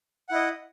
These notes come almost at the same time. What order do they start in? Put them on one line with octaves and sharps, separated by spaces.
F#5 E4 D#5